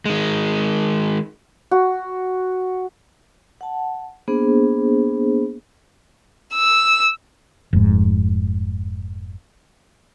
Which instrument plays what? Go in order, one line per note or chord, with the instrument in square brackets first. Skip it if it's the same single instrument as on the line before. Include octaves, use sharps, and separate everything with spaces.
[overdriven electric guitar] D#3 G#3
[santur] F#4
[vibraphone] F#5 A5
A#3 B3 D4 G#4 C5
[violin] E6
[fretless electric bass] F1 G#2